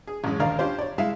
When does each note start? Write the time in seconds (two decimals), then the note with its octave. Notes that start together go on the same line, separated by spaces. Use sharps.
0.07 G#4
0.24 A1 F#2 G#3
0.40 A#1 D#2 A#4 D5 F5
0.59 C#4 D4 F4 G4 C5
0.79 C#5 D5
0.98 G#3 E4 E5 F5